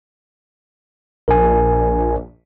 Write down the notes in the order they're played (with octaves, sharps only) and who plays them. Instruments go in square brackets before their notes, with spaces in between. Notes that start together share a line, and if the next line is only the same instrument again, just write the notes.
[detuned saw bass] A#1 [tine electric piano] A#4 G#5